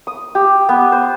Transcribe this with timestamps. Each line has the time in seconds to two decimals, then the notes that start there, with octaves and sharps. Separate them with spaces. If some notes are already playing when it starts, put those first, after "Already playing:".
0.07 D#6
0.35 G4
0.69 B3
0.92 C5